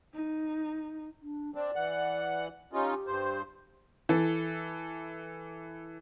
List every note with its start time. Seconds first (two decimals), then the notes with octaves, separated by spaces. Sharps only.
0.14 D#4
1.22 D4
1.55 C4 D4 D5
1.76 E3 F#5 F#6
2.73 C#4 D#4 F4 G4
3.07 G2 C5
4.09 E3 A4